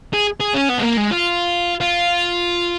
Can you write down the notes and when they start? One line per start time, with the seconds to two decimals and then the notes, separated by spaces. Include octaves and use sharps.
0.14 G#4
0.41 G#4
0.55 C#4
0.70 B3
0.79 G#3
0.83 A#3
0.98 G#3
1.11 F4
1.81 F4